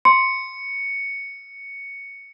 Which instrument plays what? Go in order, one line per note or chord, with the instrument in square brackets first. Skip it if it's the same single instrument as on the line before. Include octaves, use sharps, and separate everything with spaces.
[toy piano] C6 [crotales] C#7